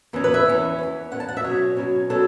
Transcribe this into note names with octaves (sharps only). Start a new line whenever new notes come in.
E2 E3 C#4
B4
E5
E2 E3 C#4
E2 E3 C#4
E2 E3 C#4 F#5
A5
F#5
E5
B2 F#3 C#4 C#5
B2 F#3 C#4
B2 F#3 C#4 A4